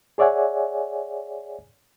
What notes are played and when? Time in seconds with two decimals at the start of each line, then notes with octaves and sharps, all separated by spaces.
0.18 G#4 C#5 D5 E5 F#5 G#5